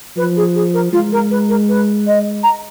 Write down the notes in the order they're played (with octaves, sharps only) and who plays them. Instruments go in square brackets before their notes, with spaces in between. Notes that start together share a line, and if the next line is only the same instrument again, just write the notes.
[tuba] F3 [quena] B4
[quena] G#4
G#4
A#4
[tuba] G#3 [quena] F4
[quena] A#4
B4
A#4
B4
D#5
A#5